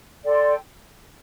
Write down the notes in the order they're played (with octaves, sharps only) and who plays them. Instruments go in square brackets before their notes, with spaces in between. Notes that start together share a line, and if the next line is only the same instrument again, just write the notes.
[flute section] A4 D5 G5 C6